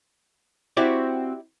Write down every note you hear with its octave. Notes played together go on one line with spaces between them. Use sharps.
C4 E4 F#4 G4 D5